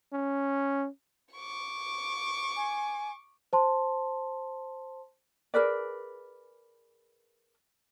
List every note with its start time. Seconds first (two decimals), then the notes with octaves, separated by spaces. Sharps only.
0.13 C#4
1.34 C#6 D6
2.56 G#5
3.53 C5 A5 C6
5.54 G#4 A#4 B4 D5